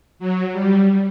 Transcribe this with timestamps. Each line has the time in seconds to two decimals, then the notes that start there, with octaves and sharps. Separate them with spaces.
0.19 F#3
0.52 G3